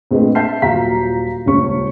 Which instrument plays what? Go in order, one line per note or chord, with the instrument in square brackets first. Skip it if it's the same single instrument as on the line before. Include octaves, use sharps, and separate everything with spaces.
[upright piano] A#1 A3 C4 G#4 B4 D#5
E5 A5 F6 G6 C7
D#1 A#2 F#3 F5 A#5 B6
D#1 C#2 C#4 C#6